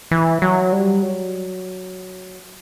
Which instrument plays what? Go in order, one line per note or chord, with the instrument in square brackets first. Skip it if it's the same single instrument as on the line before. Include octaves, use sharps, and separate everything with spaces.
[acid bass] E3
F#3
G3
F#3